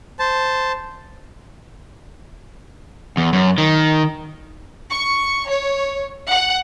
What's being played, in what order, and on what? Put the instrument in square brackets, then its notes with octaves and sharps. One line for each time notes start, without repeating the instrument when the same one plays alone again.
[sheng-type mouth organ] C5 A5
[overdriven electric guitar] E2
F#2
D#3
[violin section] C#6
C#5
F#5